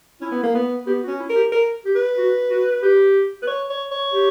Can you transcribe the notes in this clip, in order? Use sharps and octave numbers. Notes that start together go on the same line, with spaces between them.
C#4 E4
B3
A#3
B3
B3 G4
F#4
C#4
E4
A#4
G4
A#4
G4
B4
F#4
F#4
G4
B4
C#5
C#5
C#5
G4